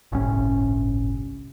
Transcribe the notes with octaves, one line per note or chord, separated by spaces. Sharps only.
G1 C2 A2 C#4